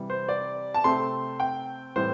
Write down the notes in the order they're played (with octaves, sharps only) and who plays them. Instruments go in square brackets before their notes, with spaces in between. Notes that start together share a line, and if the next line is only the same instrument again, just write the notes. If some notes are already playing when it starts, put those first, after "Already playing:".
Already playing: [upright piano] C3 E3 G3
C5
D5
A5
C3 A3 C4 C6
G5
A2 E3 G3 C4 C5